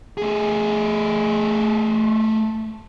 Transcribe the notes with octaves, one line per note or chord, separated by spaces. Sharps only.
A3 G#4